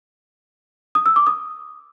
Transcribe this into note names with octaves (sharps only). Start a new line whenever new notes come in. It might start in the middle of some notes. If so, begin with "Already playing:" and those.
D#6
E6
D6
D#6